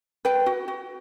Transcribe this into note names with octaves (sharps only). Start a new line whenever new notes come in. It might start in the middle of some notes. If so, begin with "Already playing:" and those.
B4 G5
F#4
F#4